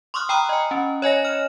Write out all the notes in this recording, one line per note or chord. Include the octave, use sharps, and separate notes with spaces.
C6 C#6 D#6 F6 F#6
G5 A#5 B5 D#6 E6 F#6
D#5 G#5
C#4
C#5 D#5 G#5 A#6
F6 E7